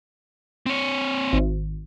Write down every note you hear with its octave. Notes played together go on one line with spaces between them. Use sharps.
C4 C#5
G#1